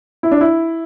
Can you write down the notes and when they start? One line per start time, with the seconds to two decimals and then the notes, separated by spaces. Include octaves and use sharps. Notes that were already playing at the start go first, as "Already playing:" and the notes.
0.23 E4
0.31 D4
0.41 E4